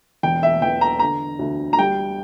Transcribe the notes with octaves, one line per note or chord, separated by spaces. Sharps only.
E1 G5
E5
E2 G5
A#5
D3 A#5
D2
A#5
G3 G5